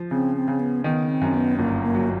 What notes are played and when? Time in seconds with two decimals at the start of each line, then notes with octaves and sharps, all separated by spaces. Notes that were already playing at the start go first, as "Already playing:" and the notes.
Already playing: F3
0.11 C#3 C4
0.36 C4
0.48 C#3
0.60 B3
0.84 D#3 B3
1.09 C4
1.22 F#2
1.34 B3
1.57 G1 A#3
1.83 A#3
1.94 F#3